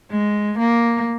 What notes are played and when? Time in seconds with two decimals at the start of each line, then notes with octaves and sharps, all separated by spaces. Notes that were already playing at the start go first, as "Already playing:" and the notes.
0.11 G#3
0.59 A#3